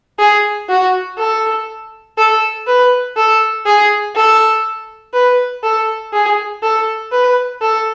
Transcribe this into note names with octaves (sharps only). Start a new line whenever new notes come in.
G#4
F#4
A4
A4
B4
A4
G#4
A4
B4
A4
G#4
A4
B4
A4